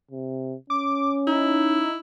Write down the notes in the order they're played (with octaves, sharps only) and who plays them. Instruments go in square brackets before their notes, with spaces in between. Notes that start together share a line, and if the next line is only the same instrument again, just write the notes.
[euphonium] C3
[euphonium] C#4 [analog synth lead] D6
[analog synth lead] D#4 [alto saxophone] E4